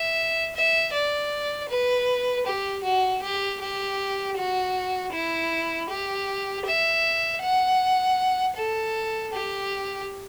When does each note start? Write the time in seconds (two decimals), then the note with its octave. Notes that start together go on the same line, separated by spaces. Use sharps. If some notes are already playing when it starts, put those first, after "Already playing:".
Already playing: E5
0.55 E5
0.94 D5
1.69 B4
2.47 G4
2.84 F#4
3.23 G4
3.61 G4
4.37 F#4
5.13 E4
5.90 G4
6.66 E5
7.42 F#5
8.56 A4
9.33 G4